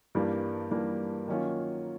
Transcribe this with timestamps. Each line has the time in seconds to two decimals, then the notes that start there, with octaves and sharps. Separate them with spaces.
0.15 G2 E3 G3 A#3
0.71 G2 E3 G3 A#3
1.28 D#3 F#3 A#3 C#4 F4